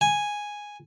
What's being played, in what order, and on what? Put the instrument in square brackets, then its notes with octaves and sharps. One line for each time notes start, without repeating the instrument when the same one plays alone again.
[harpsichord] G#5